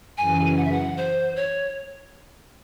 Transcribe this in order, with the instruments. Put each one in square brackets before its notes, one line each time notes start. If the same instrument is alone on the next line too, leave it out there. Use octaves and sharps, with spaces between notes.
[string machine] F#2 C#3 E3 [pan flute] G#5
[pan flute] F#5
E5
F#5
C5
C#5